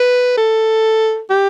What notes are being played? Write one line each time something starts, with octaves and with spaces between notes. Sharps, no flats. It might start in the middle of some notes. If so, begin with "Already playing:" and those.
Already playing: B4
A4
G4